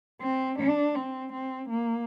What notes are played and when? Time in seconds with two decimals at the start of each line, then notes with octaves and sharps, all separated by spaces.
0.22 C4
0.59 D4
0.95 C4
1.33 C4
1.70 A#3